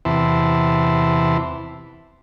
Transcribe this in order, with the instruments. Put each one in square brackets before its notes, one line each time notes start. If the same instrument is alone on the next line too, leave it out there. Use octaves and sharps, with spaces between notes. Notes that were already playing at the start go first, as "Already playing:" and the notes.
[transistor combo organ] E2 C3 E3 E4 A5 C6